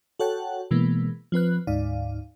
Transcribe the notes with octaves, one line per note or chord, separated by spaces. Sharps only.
F#4 A4 C#5 F#5 G5 A5
B2 E3 G#3 A#3 B3
F3 C4 B4 F#6
D2 G#2 D#4 D5 F5